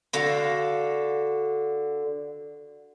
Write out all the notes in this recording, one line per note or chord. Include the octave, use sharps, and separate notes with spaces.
D3 F#4 F5